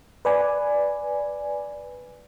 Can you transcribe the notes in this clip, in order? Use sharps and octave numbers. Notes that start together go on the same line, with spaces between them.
B4 D5 G#5